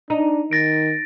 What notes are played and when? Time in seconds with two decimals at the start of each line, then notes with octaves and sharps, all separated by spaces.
0.10 D4 D#4
0.51 D#3 A6 A#6 D7